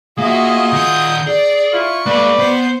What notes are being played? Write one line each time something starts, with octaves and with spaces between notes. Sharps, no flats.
A#3 F4 F#4 G#4 D#5 E5
D#3 F#5 D#6 G6
G#4 D5
E4 F4 C#6
G3 A#3 A4 B4 D5
B3 C5